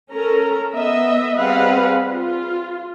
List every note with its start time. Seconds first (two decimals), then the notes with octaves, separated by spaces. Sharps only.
0.14 C#4 A4 A#4 A#5
0.74 B3 D#5 E5
1.38 G3 C4 G#4 B4 F5 F#5
2.12 F4